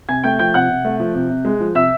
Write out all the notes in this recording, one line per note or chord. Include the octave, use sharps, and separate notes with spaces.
C3 G#5 G#6
A3 G5 G6
F3 G5 G6
C3 F#5 F#6
C3
A3
F3
C3
C3
G#3
F3
C3 E5 E6